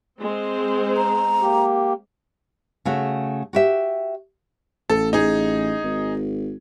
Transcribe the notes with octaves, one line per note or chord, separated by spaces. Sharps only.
G#3 C4 C5
A#5
A#3 G4
C#3 A3 F#4
F#4 G4 E5
A1 A4
D#4 G#4
G#1